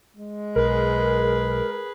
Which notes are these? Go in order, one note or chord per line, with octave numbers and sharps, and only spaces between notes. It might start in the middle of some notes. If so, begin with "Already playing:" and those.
G#3
B1 G#4 A#4 B4